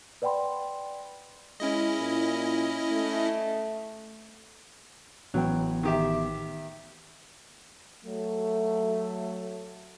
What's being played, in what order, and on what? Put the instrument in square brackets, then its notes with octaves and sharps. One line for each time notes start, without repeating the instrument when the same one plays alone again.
[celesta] B4 D5 F#5 G5 B5 C6
[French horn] G#3 [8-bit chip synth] C#4 E4 D#5
[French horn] A#2
A3
[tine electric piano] A1 B3 G5 [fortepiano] F#3
[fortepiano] D#3 G4 E5
[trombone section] F#3 A3